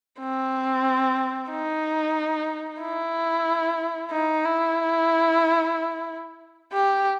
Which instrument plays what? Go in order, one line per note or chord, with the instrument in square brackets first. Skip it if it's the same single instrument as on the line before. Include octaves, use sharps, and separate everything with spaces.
[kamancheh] C4
D#4
E4
D#4
E4
G4